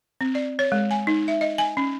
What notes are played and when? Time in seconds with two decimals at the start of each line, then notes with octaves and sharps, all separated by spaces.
0.21 C4
0.35 D5
0.59 C#5
0.72 G#3
0.91 G#5
1.07 D#4
1.28 E5
1.41 D#5
1.58 G#5
1.77 C#4